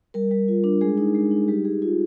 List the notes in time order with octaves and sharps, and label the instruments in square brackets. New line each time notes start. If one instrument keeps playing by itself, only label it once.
[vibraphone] G3 A#4
G3
F4
D4
G#3 G#4
D#4
G#3
D#4
G3 G4
G3 G#4
F4